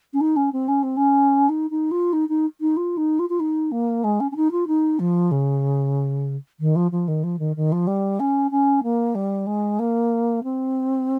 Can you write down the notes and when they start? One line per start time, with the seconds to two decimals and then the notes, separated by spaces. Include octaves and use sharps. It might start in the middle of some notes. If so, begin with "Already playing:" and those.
0.13 C#4
0.21 D#4
0.36 C#4
0.53 C4
0.68 C#4
0.83 C4
0.97 C#4
1.49 D#4
1.71 D#4
1.91 F4
2.13 D#4
2.29 D#4
2.61 D#4
2.77 F4
2.97 D#4
3.19 F4
3.30 F4
3.40 D#4
3.72 A#3
4.04 G#3
4.20 C#4
4.32 C#4
4.36 D#4
4.52 F4
4.68 D#4
4.99 F3
5.31 C#3
6.60 D#3
6.76 F3
6.92 F3
7.08 D#3
7.24 F3
7.39 D#3
7.56 D#3
7.72 F3
7.87 G3
8.20 C#4
8.51 C#4
8.83 A#3
9.15 G3
9.47 G#3
9.79 A#3
10.44 C4